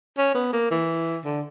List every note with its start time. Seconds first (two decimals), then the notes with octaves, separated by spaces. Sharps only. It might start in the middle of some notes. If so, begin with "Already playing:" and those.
0.18 C#4
0.35 B3
0.53 A#3
0.71 E3
1.25 D3